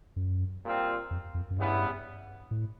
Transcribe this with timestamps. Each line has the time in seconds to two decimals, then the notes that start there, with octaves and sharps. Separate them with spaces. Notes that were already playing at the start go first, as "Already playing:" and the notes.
0.16 F#2
0.64 A#2 G3 C4 F4
1.11 F2
1.34 F2
1.51 F#2
1.57 G2 C#3 E3 G3 B3 E4
2.51 A2